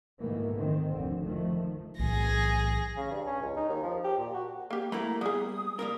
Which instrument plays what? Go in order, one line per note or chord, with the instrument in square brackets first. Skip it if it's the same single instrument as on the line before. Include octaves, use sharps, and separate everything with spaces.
[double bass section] G#2 B2 D#3 E3 A3 A#3
D#3 C4
F1 D2 D3
D#3 F3 A3
[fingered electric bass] B1 A2 E3 [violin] G#4 A#6
[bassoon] C#3
G2
C#4
C#2
D#4
D#2
F3
G4
A#2
F#4
[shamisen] A#3 G4 [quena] G5
[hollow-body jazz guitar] A3 A#3 E4 [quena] A#5 [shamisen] B5
[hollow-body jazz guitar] G3 [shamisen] B3 G#4 [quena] D#6
[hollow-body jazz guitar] G3 A#3 A#4